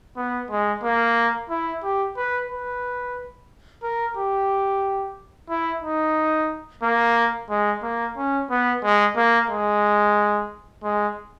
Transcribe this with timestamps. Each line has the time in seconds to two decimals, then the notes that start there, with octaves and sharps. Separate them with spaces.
0.17 B3
0.50 G#3
0.84 A#3
1.50 E4
1.83 G4
2.17 B4
2.50 B4
3.83 A#4
4.17 G4
5.49 E4
5.83 D#4
6.83 A#3
7.50 G#3
7.83 A#3
8.17 C#4
8.50 B3
8.83 G#3
9.16 A#3
9.50 G#3
10.84 G#3